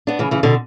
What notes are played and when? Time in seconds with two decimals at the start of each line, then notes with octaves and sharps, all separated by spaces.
0.07 B3 D4
0.19 C#3 E3
0.31 C#3 E3
0.43 B2 D3